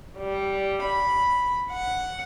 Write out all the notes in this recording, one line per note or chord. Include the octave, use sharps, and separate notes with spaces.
G3
B5
F#5